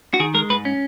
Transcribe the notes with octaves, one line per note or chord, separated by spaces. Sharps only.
F#4
D#3 G#4
G#3 A#4
G#2 B4
C#4